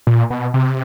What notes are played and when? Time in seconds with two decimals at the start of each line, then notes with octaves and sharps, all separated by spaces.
0.07 A#2
0.30 B2
0.54 C3